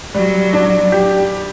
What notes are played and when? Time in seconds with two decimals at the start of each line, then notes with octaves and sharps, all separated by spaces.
0.14 F#3 G3
0.53 D4
0.92 G4